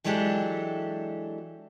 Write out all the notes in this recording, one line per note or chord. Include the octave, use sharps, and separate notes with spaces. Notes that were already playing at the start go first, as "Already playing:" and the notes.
E3 F#3 G#3 D4 G4 A4